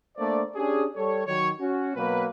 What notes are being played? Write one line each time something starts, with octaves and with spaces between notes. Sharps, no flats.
A3 A#3 D4 C5 D5
C#4 D4 G4 G#4
G3 A4 C#5
D#3 F#3 C#5
C#4 F#4
B2 F#3 A#3 B4